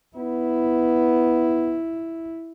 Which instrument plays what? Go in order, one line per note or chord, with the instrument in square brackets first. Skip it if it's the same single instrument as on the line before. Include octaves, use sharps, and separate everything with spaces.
[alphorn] B3 [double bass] E4